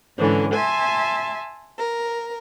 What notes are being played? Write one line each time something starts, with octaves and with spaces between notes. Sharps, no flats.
G#2 D3 E3 C#4
E5 G#5 A5 C6
A#4